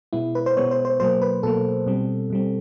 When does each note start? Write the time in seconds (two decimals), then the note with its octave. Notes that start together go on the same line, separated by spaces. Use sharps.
0.13 B2 G#3 B3 E4
0.35 B4
0.46 C5
0.57 B2 G#3 B3 C#5
0.71 C5
0.85 C5
1.00 B2 F#3 A#3 C5
1.22 B4
1.43 B2 F#3 A#3 A4
1.86 B2 G3 C4
2.30 B2 G3 C4